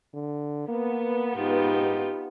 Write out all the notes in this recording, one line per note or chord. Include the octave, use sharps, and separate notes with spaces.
D3
A#3 B3
G#2 D#4 F4 G4